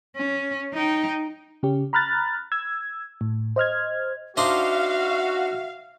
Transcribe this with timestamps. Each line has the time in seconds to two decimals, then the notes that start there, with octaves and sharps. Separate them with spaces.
0.16 C#4
0.74 D#4 G5
1.63 C#3 C#4 G4
1.93 A#5 B5 F6 F#6 A6
2.52 E6 G#6
3.21 A2
3.56 C5 D#5 F6 G#6
4.37 D4 D#4 F#4 C5 E5 F5